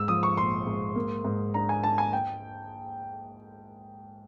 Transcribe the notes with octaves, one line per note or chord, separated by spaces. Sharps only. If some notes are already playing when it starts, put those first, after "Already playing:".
Already playing: G#2 E6
F3 D#6
C#6
A#1 C6
G#2
A#3
G#2
D4 A#5
G#5
D4 A5
G#5
G5